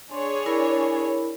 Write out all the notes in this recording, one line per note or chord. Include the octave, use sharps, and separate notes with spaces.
D4 G#4 C#5 C6
E4 A#4 B5